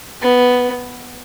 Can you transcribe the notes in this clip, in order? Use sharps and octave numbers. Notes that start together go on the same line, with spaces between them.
B3